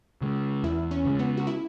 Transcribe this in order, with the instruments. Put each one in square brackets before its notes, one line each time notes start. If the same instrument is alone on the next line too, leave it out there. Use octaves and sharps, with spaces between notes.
[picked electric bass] C#3 G#3
[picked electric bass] E2 [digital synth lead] E4
[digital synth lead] C#4
[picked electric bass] C#3 G#3
[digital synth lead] B3
F#4
E4